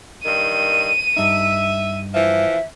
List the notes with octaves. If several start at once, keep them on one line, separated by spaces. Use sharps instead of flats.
G2 D#3 D#7
G2 D#4 E5
E3 F3 E5